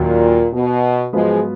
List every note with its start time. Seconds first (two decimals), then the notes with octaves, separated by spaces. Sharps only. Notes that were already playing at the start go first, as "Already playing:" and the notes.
Already playing: D#2 A#2 D#3 F#3
0.53 B2
1.13 G#2 F3 F#3 G#3 B3 F4 B4